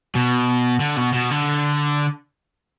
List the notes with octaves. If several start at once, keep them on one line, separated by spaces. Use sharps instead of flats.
B2
D3
B2
B2
D3